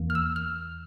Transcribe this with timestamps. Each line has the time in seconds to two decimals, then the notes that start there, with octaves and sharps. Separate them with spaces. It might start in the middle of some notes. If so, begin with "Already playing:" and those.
Already playing: E2 E3 A#3
0.10 F6
0.15 E6
0.36 F6